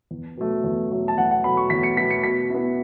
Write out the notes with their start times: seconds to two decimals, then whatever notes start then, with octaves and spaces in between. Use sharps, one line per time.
0.11 E2
0.37 B2 F#3 A3
0.64 E2
0.91 B2 F#3 A3
1.08 A5
1.18 E2 F#5
1.31 F#5
1.44 B2 F#3 A3 B5
1.57 C#6
1.70 E2 B6
1.83 C#7
1.97 B2 F#3 A3 B6
2.10 C#7
2.23 B2 B6
2.50 B3 E4